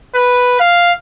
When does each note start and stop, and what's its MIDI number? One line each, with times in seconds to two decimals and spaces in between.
0.15 0.57 71
0.60 0.93 77